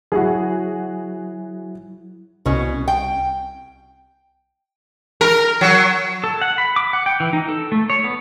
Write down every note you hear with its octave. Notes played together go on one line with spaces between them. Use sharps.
F#3 E4 F#4 G#4
C2 B2 C#4
G5
A#4
F#3
A4
F#5
B5
D6
F#5
G5
E3
D#4
A4
A3
C#5
B3